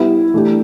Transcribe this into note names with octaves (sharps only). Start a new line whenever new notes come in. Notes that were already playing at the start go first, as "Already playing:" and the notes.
Already playing: G3 B3 E4
E3 A3 D4 G4